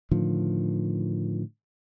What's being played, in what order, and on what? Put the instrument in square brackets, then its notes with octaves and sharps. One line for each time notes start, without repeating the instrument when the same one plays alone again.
[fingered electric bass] A2 D3 D#3 F3